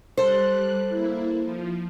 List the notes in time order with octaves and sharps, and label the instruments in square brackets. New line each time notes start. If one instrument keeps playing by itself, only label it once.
[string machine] G3 F#6 [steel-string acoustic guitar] A4 C5
[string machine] A#3 E4
F3